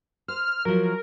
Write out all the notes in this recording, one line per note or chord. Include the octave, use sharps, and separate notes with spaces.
C5 F6
F3 F#3 A#4